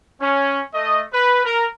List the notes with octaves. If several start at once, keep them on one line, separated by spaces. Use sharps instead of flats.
C#4
A3 D#5
B4
A#4